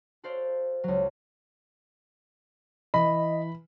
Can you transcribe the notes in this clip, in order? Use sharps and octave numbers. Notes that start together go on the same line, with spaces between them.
F#4 A4 C5 D5 F5
C#2 F#3
E3 D#5 B5